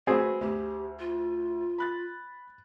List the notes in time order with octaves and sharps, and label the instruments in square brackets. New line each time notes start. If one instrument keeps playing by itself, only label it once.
[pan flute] A3 [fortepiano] C4 G#4 [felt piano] F#4 B4
[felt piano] D2 [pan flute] G4
[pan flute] F4
[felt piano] B5 F#6 A6